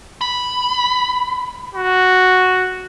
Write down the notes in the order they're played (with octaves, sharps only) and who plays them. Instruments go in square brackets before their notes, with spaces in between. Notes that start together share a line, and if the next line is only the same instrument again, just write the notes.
[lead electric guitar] B5
[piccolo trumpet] F#4